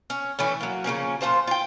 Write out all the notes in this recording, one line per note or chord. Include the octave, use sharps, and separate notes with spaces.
C#4
E3 A3 C#4
F#3 A#3
C#3 F3 A#3 C#4
A#2 F4 C5 A5
F4 G5